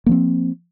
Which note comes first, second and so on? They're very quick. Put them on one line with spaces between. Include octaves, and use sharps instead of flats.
A#3 F3 C4